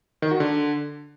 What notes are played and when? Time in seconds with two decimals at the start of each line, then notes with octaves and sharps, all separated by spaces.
0.22 D#3
0.31 F#4
0.40 D3